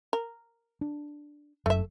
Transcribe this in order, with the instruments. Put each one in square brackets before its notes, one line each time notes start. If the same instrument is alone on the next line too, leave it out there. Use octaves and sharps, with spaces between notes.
[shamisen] A#4
[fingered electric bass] D4
[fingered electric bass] F#1 F#2 [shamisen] A3 E5